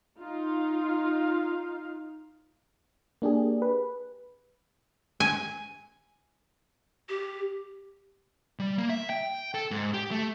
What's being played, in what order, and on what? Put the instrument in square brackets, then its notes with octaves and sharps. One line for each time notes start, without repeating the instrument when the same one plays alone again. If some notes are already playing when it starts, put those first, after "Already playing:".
[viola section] D#4 F4 F5
[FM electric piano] A#3 D4 G4 G#4
B4
[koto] G#5
[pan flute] G4
[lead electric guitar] G3
A#3
E5
G5
A4
G#2
G4
A3